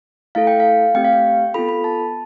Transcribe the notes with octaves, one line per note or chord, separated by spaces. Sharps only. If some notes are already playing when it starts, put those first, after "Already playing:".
A3 E4 A4 F5
G5
F5
A3 C4 G4 G5
F5
G5
B3 F4 A4 B5
B5
A5